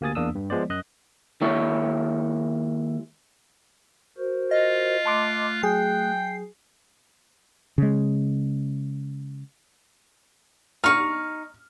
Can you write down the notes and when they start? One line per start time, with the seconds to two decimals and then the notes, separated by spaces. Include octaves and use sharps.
0.01 D2 A#3 G4 G#5 D#6 A6
0.15 E2 A#3 D4 D#6 E6
0.35 G2
0.50 F3 G#3 B3 C5 D5
0.69 F#2 D#5 F#6
1.41 D#2 G#3 E4 C#5
4.18 F#4 A#4 C5
4.51 F4 D#5
5.06 A3 A5 C6 D6 F#6
5.63 F#3 G#4 G5 C7
7.78 C#3 G#3
10.84 D#4 C#6 F6